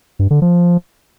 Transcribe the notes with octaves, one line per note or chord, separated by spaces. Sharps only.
G2
D3
F3